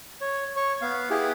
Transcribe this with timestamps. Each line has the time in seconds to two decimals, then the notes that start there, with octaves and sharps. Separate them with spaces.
0.21 C#5
0.56 C#5 C#6
0.82 B3 F5
1.10 B3 E4 G4 G#4